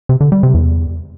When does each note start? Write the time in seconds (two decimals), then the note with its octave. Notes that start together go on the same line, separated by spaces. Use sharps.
0.09 C3
0.21 D3
0.32 G3
0.43 C3
0.54 E2